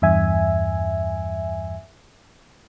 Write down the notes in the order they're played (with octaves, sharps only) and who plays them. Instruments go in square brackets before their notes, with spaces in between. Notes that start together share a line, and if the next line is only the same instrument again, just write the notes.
[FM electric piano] E2 G2 E5 G#5